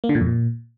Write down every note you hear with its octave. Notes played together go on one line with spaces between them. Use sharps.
A#3
D3
A#2
F2
A#2